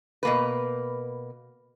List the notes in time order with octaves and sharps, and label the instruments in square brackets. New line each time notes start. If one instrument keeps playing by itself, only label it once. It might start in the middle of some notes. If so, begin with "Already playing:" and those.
[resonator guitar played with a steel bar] B2 A#3 B4